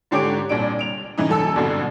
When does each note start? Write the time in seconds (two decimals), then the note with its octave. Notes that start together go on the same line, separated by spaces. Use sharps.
0.11 G#2 D3 G4 C#5 D6 D7
0.49 C2 A#2 D4 D7
0.79 D7 F7
1.18 C#3 E3 D#4
1.29 F#2 A4 E6
1.56 C2 G2 B2 D3